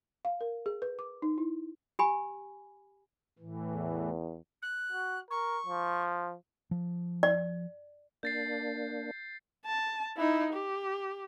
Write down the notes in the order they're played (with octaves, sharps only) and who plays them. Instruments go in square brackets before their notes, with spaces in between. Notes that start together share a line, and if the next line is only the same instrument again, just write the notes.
[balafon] F5
A#4
G#4
B4
D6
D#4
E4
[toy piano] G4 G#5 B5
[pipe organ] A2 E3
[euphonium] E2
[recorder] F#6
[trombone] F#4
[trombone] A#4 [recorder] C#6
[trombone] F3
[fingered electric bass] F3
[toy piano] D5
[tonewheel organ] A#3 D4 [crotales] G6 A6 C7
[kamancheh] A5
D#4 E4
G4